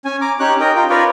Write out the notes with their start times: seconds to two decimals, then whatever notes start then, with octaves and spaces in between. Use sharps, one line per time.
0.05 C#4 G#5
0.21 A#5 D6
0.40 C#4 D#4 G4 C#5 F#6
0.60 A#4 D#5 G5
0.76 D#4 F4 G5
0.90 F4 A#4 B4 C#5 D5